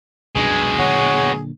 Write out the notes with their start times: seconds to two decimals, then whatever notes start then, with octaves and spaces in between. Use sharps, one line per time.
0.36 C2 F#2 B2 G#3 D4 G#4
0.79 A#2 D3 F#3 C#5 F#5